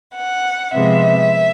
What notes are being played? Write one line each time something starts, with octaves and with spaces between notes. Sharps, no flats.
F#5
C3 F3 G#3 B3 E5